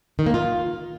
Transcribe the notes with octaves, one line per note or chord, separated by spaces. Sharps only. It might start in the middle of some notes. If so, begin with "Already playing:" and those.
D#3
A#3
F4